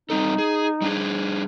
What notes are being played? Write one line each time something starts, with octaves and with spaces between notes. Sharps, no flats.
G3 C4 D#4 A4
G#4
G3 D4 G#4